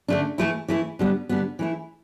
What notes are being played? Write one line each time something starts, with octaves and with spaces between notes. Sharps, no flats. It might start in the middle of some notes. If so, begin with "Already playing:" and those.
D3 A3 D4
E3 A3 E4
E3 A3 E4
D3 G3 B3
D3 G3 B3
E3 A3 E4